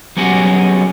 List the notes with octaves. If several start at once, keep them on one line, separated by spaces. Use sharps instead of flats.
F#3 G3 B3 C#4 F#4 G#4